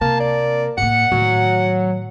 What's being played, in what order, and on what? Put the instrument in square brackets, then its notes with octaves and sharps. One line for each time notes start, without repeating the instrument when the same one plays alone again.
[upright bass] C3 [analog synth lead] A#3 [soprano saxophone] A5
[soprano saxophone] D5
[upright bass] A2 A#3 [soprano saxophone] F#5 [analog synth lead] C#7
[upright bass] A2 D#3 [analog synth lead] F#3